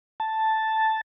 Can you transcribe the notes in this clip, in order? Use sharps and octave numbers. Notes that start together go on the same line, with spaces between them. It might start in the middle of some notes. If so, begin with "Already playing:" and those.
A5